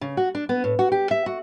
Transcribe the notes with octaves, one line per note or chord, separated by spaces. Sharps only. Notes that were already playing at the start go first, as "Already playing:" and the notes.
C#3
F#4
D4
B3
A2
F#4
G4
E5
F#4